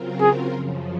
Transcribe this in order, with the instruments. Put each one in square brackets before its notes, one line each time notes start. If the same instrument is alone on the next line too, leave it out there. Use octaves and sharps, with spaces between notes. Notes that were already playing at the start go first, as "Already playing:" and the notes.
Already playing: [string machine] C#3 F#3 C4 F4 A#4
[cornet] G#4
[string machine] F#2 C#3 F3